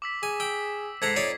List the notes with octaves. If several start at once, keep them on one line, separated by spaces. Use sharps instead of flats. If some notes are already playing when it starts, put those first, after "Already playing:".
D6 E6 B6
G#4 G#5
G5 E6
G#2 A4 F#5 A#5 G#6 B6 C7
F2 D#4 C#5 D5